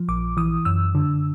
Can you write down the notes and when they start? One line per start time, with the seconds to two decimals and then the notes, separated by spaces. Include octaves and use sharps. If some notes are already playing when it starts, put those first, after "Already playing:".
Already playing: F3
0.08 A#1 D6
0.37 E3 D#6
0.65 F#2 E6
0.95 D3